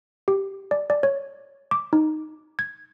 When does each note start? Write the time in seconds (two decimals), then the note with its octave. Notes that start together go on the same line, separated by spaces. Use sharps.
0.28 G4
0.71 D5
0.90 D5
1.03 C#5
1.71 D6
1.93 D#4
2.59 G#6